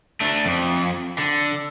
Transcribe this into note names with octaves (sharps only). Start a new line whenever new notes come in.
A3 D4
F2
D3